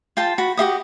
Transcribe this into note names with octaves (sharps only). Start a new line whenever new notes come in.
F4 G5 A5
F#4 B5
F#4 G4 E5 D#6